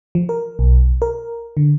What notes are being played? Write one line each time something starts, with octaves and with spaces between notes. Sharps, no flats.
F3
A#4
B1
A#4
D3